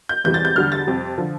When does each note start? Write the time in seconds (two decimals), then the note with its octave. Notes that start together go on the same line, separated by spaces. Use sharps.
0.09 G6
0.24 E2 C3 E3 G3 G6
0.34 A6
0.45 G6
0.55 E2 D3 G3 F6
0.72 A6
0.87 F2 C3 G3
1.18 D3 F3